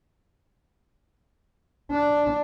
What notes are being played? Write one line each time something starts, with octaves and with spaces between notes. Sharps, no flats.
D4